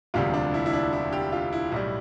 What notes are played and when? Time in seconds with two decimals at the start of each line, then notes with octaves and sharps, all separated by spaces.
0.14 E1 D2 C3 G3 F4
0.34 D4
0.54 E4
0.66 E4
0.73 D4
0.93 E4
1.13 G4
1.32 F4
1.53 E4
1.72 B1 A2 G3 E4